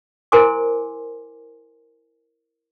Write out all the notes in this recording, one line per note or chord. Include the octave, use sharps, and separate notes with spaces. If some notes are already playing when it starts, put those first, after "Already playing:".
E4 A#4 C5 G#5 C6 D6